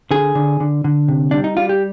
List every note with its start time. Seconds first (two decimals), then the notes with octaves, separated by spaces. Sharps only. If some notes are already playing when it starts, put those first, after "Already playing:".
0.11 D3 G#4
0.35 D3
0.60 D3
0.84 D3
1.08 C3
1.31 G3 D4
1.44 D#4
1.57 G3 F4
1.69 G4